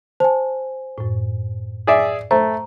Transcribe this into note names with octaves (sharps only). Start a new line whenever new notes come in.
C5 G#5 A5
F#2 A2
G#4 D5 E5
A3 C5 A#5